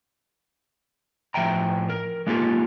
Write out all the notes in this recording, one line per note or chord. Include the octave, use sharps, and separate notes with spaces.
A2 F3 E5 G5 A#5
A#4
G#3 A#3 D#4 F4 G4 A4